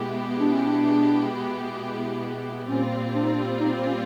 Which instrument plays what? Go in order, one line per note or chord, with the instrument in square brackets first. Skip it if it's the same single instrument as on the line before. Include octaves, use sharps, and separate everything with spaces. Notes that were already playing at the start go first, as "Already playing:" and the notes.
Already playing: [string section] B2 G#3 B3 E4 G4
[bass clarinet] D4
C#4
D4
[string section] A#2 G3 C4 F4 [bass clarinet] C#4
[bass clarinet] D4
D#4
D4
D#4
C#4